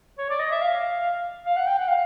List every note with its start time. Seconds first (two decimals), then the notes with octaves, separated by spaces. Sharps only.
0.18 C#5
0.30 D5
0.40 D#5
0.51 E5
0.62 F5
1.46 F5
1.57 F#5
1.67 G5
1.78 F#5
1.88 F5